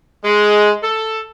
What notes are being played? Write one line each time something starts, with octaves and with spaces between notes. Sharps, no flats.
G#3
A4